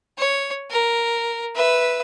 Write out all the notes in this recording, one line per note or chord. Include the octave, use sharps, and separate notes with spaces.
C#5
A#4
B4 E5